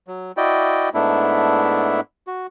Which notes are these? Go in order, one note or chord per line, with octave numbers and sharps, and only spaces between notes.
F#3
E4 F#4 D5 D#5 G5
G#2 A3 B3 D4 E4
F#4